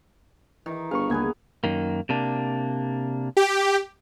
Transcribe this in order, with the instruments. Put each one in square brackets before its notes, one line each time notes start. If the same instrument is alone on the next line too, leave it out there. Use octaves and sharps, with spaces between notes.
[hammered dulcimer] D#3 [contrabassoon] E3
[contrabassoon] G1 [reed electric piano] G#4 B4 C#6 [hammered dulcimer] F5
[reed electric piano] C#2 A#3 G#6 [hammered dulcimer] B3 G#4 B4
[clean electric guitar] F#2 D#3 A#3
C3 A#3 D4
[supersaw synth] G4